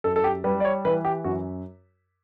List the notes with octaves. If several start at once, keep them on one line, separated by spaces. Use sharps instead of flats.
F#2 A4
A4
G4
G3 B4
D5
C#5
E3 B4
G4
F#2 F#4